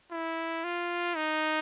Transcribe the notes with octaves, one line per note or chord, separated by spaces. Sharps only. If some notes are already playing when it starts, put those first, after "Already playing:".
E4
F4
D#4